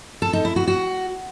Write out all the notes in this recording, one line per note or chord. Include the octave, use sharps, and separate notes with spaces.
A4
D#4
E4
F#4
F#4